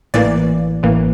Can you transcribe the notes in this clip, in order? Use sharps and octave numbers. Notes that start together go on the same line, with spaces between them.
A1 A2 E3 A#3 D5
A1 A2 E3 A#3